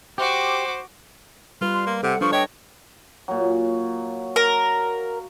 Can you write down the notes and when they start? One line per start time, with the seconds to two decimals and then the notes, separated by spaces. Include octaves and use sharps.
0.18 F#4 G4 C5 D6
1.61 G3 F4 B4
1.73 C6
1.86 A#3
2.03 C3 A4 F#5
2.21 F3 D4 B4 C#6
2.32 C#5 D#5 G5
3.28 A#2 F#3
4.36 A#4